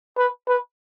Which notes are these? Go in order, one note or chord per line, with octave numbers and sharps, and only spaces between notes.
B4
B4